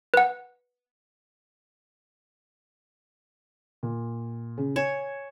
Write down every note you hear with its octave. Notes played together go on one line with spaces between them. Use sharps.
B4 F#5
A#2
C#3
C#5 G#5 E7